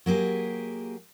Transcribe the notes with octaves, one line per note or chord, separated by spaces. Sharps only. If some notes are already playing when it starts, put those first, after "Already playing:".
F#3 A#3 G4 G#4